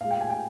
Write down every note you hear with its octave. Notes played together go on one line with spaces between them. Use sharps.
A#2 G#3 F5
G5
G#5
G5